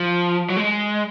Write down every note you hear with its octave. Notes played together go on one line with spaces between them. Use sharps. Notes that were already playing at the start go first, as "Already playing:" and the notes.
Already playing: F3
F#3
G#3